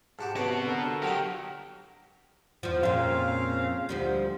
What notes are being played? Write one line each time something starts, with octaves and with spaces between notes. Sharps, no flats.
G#2 F#4 G4 A5
C3 B3 F#4 B4 C#5
D3 A4 A#4 F#5
A5
F#3 D#4 G4 F#5 G5 F6
E2 F3
F2 A#2 C#3 C4 F5
D2 F3 G3